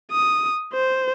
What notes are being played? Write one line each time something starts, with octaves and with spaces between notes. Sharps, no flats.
D#6
C5